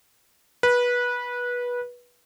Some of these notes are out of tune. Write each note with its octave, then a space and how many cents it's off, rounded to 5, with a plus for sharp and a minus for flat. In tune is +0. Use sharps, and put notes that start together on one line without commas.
B4 -20